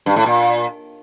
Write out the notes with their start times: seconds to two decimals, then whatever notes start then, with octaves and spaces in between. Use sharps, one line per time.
0.06 G2
0.16 A2
0.26 A#2